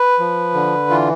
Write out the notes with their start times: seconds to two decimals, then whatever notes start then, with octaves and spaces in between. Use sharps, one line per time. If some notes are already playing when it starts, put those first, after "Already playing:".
Already playing: B4
0.19 F3
0.54 D3
0.90 E3 F4